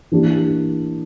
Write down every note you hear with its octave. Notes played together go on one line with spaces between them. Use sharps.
E3 A#3 D4 G4